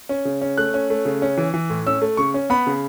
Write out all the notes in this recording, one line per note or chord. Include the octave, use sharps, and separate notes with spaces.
C#4
C#3
C#4
A3 F#6
C#4
A3
C#3
C#4
E3
E3
A2
C#4 E6
A3
C#3 C#6
C#4
B3 B5
C#3